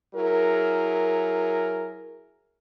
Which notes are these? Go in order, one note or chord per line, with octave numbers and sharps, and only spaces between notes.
F#3 E4 G#4 A#4